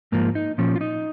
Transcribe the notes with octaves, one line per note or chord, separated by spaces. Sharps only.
G#2 F3 A#3
D#4
A#2 F3 C#4
F4
D#4